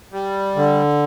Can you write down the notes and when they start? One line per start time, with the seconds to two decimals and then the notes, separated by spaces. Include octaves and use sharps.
0.12 G3
0.56 D3